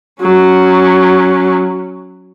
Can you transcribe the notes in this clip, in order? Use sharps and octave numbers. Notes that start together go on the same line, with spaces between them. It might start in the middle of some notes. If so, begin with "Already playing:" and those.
F#3 C#4